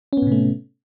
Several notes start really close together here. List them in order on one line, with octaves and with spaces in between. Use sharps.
C#4 B3 A2 C3 A3